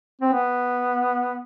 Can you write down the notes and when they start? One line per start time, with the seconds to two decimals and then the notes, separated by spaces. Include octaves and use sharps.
0.21 C4
0.32 B3